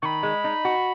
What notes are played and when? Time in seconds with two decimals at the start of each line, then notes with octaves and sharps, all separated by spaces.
0.02 D#3 B5 C#6
0.23 G#3
0.44 D#4
0.65 F#4